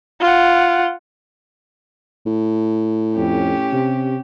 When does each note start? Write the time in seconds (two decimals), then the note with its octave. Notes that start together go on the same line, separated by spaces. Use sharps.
0.21 F4 F#5
2.26 A2
3.16 F2 C#4 G4
3.73 C3